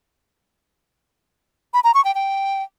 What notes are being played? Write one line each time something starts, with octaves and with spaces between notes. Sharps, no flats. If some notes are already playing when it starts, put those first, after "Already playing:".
B5
A#5
C#6
G5
G5